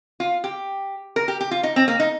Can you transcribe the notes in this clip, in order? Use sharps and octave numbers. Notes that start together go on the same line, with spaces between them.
F4
G4
A#4
G4
G4
F4
D#4
C4
A#3
D#4